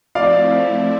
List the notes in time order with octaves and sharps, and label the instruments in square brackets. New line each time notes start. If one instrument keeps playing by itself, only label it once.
[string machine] F3 A3 C4 E4 [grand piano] D5 F5